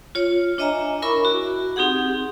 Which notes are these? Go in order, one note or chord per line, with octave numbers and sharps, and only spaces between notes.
F4 C#5
D4 C#5 D#5 E5 G#5 A#5
E4 A#4 E5 B5 C#6 D6
F#4
C4 D#4 G4 G#4 F#5